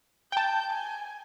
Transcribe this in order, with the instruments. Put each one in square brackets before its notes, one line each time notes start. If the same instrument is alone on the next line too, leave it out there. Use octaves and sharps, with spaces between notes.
[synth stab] G5 A5 [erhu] G6
[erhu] G#5